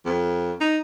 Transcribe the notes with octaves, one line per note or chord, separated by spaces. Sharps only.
F2
D#4